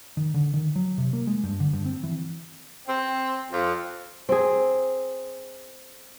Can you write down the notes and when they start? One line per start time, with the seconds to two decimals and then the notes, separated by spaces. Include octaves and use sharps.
0.17 D#3
0.34 D3
0.54 D#3
0.76 F#3
0.98 C3
1.13 A#3
1.27 G#3
1.44 G2
1.60 D3
1.73 G2
1.86 C4
2.03 E3
2.87 C4
3.52 F2
4.29 C4 G#4